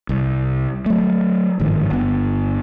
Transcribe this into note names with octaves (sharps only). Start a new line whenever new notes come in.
C2
F#3 A3
G1 G#2 D#3 F3
G1 B3